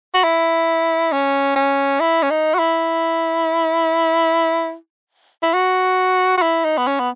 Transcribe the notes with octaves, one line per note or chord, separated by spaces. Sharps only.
F#4
E4
C#4
C#4
E4
C#4
D#4
F#4
E4
E4
F#4
F#4
E4
D#4
B3
C#4
B3